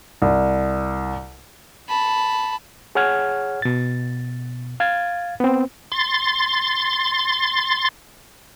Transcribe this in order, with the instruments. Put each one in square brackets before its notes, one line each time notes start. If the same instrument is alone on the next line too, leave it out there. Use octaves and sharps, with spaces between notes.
[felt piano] C2
[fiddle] A5 B5
[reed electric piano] G#4 C#5 F#5 F6 G#6
B2 A6
F5 G#6 A6
B3 C4
[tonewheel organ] C6 A6